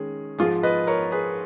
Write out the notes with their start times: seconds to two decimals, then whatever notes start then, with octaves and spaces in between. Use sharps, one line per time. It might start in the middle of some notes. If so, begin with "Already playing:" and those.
Already playing: D#3 G#3 C#4 G#4
0.38 G#2 F3 G#3 F4 G#4
0.63 B4 D#5
0.87 A#4 C#5
1.12 G#4 B4